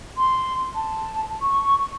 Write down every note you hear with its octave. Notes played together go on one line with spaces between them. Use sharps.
C6
A5
C#6